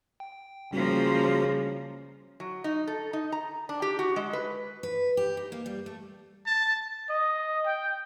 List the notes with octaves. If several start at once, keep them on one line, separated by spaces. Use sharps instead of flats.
G5
C#3 F3 G3 A#3 C#4 F#4
F#3
D#4
A4
D#4
A#5
D4
G4
F#4
G#3
B4
B4
G4
D#4
A#3
G3
A3
A5
D#5
G5